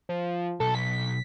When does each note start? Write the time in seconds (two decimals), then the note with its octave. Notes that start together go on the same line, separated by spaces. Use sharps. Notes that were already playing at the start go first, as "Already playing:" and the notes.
0.09 F3
0.60 B1 A4
0.75 B6